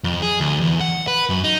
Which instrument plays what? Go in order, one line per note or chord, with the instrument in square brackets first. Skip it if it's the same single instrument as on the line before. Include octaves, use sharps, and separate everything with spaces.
[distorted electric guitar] F2
G#4
D2
E2
F#5
B4
F#2
D#4